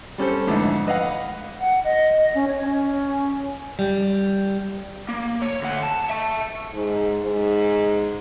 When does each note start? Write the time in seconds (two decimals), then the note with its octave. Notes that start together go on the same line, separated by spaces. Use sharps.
0.18 G3 C#4 A4 C5
0.47 F2 G#2 D3 E3 A3
0.87 B4 D#5 F5 F#5
1.60 F#5
1.84 D#5
2.35 C#4
2.48 C#5
2.64 C#4
3.79 G3
5.09 A#3
5.42 C#5
5.61 D2 F#5
5.83 A5
6.10 E5 A5
6.74 G#2
7.22 G#2